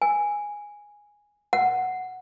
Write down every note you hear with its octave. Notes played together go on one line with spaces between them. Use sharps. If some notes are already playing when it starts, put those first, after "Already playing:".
G#5
F#5